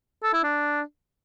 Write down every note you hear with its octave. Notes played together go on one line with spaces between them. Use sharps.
A4
E4
D4